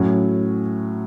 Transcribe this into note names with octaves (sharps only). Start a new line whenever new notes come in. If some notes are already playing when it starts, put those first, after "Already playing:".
Already playing: A2 F#3 C#4 F#4